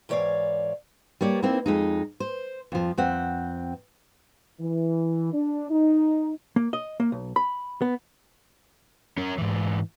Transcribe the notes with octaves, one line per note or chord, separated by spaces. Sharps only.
G#2 E3 C#5 D5 F5
G3 A#3 C#5 D5
A#3 C4 D#4 E4
F2 G#3 D#4
C5
F2 F3
F2 C4 F#5
E3
D4
D#4
A#3
D#5
A#3
B1
B5
B3
C#4 A#4
G#2 E3